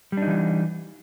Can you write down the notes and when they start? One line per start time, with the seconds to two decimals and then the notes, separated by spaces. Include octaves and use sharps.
0.12 G3
0.17 D4
0.22 D#4
0.27 E3